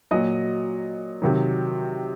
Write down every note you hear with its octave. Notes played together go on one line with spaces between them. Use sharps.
A#2 F#3 D#5
C3 D#3 F#3